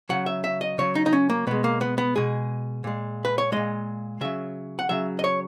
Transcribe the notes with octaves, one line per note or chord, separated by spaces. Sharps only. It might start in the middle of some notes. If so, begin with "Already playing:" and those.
C#3 F#3 F#5
E5
E5
D#5
C#3 F#3 C#5
D#4
D#4
C#4
A#3
B2 G#3 B3
A#3
B3
B3
B2 G#3 G#4
A#2 G#3
B4
C#5
A#2 G#3 D#5
C#3 F#3 E5
F#5
C#3 F#3 E5
D#5
C#5